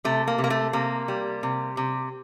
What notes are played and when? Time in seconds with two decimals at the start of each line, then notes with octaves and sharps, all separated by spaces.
0.05 C3 A3
0.28 A#3
0.38 C3
0.44 A#3
0.50 A3
0.73 C3 A#3
1.08 G3
1.43 C3
1.77 C3